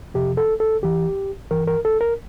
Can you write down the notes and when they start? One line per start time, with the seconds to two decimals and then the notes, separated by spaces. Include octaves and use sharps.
0.14 F2 C3 F3 G4
0.37 A4
0.60 A4
0.82 E2 E3 G4
1.51 G2 E3 A#4
1.67 A#4
1.85 A4
2.01 A#4